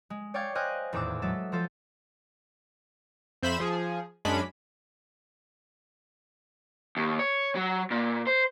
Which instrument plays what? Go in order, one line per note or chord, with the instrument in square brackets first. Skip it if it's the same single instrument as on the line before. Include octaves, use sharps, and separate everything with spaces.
[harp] G#3
C#5 D5 F5 G5 C#6 G#6
C5 D#5 G5 G#5 F6 F#6
D#1 E2 A2 D6 E6
F#3 G#3 A4 E5
F3 F4 A4 C5
[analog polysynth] F2 C5 E5 B5 E7
F3 G#4
F#2 G#3 C#4 D4 B5
[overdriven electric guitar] D#2
C#5
F#3
A#2
C5